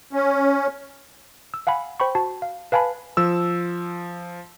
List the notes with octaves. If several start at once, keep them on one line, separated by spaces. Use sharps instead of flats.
C#4
E6
F5 F#5 G#5 B5
C5 G5 B5 C#6
F#4 A5
F5
B4 F5 G#5 A5 B5
F3 E6